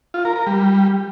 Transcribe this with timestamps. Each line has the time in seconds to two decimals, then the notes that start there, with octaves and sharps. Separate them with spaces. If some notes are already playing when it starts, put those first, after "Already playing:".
0.14 F4
0.25 A#4
0.36 A#4
0.47 G3